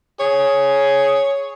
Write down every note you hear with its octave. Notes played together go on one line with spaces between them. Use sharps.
G#4 C#5